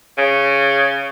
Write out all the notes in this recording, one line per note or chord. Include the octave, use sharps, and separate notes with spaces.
C#3